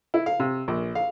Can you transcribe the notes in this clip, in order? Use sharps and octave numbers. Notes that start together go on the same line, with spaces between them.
E4
F5
C3
A#1
F5